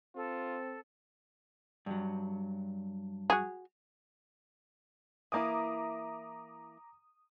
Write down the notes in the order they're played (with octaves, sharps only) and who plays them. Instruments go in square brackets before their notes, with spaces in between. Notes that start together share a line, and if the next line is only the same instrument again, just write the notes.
[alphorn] C4 [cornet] F4 [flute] A4
[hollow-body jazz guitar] G2 F#3
[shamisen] F#4 G#4
[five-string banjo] E3 A#3 E4 [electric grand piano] A#5 D6 D#6